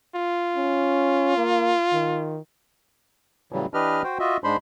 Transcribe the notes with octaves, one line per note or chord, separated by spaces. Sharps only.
F4
C#4
A#3
D#3
A2 C#3 E3 F#3 G3
E3 D4 G4 B4 D#5 F6
F#4 C5 G5
F4 F#4 D#5 E5
G#2 G#3 D4 C5 B5 C6